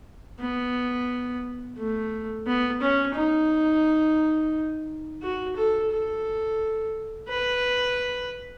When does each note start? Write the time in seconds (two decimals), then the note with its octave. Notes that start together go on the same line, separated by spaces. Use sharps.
0.39 B3
1.77 A3
2.46 B3
2.81 C#4
3.15 D#4
5.22 F#4
5.56 A4
5.91 A4
7.29 B4